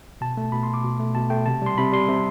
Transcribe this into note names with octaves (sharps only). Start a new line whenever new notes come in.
B2 A5
A3
B2 B5
C6
A3
D6
B2
A3
B2 A5
A3 G5
C3 A5
G3 C6
C3 B5
G3 C6
C3